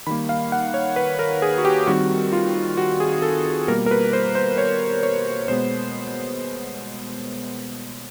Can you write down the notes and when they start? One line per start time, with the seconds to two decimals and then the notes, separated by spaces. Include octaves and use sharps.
0.07 D#3 G3 A#3 B5
0.29 F5
0.52 F#5
0.74 C#5
0.96 B4
1.19 A#4
1.42 G#4
1.58 F#4
1.65 G4
1.87 D#3 G3 C4 F#4
2.33 F4
2.77 F#4
3.00 G#4
3.22 A4
3.46 A4
3.68 B2 G3 A#3 A#4
3.86 A#4
3.91 B4
4.13 C5
4.35 C5
4.58 C#5
5.03 C#5
5.48 B2 G#3 B3 C5